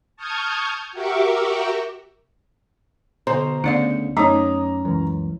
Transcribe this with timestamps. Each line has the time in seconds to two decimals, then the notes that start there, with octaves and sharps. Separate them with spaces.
0.16 A5 C#6 D#6 F6 G6 G#6
0.92 F#4 G4 A#4 E5 C#6 D6
3.27 B2 D3 C5 A#5 C6
3.64 D2 C#3 B3 D5 F5 C#7
4.17 F#2 A3 C#4 D#4 A#5 D6 D#6
4.85 C#2 F#2 E3